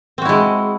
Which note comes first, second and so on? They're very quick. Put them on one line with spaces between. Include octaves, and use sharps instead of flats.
C4 F#4 E4 G#3